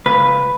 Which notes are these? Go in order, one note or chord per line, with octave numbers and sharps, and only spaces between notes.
C#2 B4